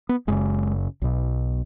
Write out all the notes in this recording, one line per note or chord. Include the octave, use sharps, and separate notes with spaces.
B3
F#1 F#2 C#3 G#3
B1 B2